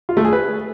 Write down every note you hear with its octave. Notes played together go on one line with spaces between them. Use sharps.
F4
A3
G#4
B4